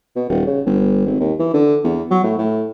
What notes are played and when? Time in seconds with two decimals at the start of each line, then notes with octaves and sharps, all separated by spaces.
0.16 B2
0.29 D#1
0.47 C#3
0.66 G1
1.06 G#1
1.20 D#2
1.40 E3
1.54 D3
1.84 E2
2.11 F#3
2.23 A2
2.38 A2